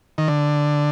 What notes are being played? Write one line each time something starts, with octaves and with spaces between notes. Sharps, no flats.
D#3
D3